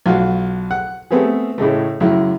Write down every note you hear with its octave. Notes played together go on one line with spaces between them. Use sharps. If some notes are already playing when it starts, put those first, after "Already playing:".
B1 F4 F#4
F#5
A3 B3 C4 G4 G#4
A2 C#3 G#3 A3
C#2 F#2 E4